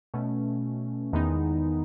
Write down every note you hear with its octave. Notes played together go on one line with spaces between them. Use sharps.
B2 A3 C#4
E2 D#3 G#3 B3 D#4